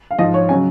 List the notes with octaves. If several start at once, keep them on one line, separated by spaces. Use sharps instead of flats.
F5
G#2 F3 D#5
C#5
C#3 F#3 G#5